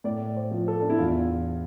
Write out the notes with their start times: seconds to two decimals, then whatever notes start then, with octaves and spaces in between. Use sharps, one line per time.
0.04 A2 D5
0.37 C5
0.51 F3
0.68 A4
0.82 D4
0.90 E4
0.99 E2 F4